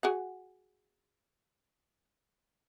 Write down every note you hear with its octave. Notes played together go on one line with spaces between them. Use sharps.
F#4 G#4 F#5